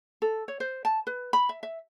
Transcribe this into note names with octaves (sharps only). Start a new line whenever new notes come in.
A4
C#5
C5
A5
B4
B5
E5
E5